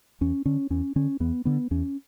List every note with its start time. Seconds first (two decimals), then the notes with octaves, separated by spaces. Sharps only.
0.21 E2 C#4
0.46 D3 C#4
0.70 E2 C#4
0.96 D3 C#4
1.20 E2 B3
1.45 D3 B3
1.71 E2 C#4